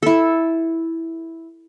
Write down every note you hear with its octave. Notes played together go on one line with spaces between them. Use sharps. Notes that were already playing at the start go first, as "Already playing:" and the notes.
E4 A4